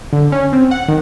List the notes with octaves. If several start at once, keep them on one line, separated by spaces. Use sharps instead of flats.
D3
C#4
C4
F#5
D#3